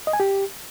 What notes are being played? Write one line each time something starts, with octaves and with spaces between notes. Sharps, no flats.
D#5
G#5
G4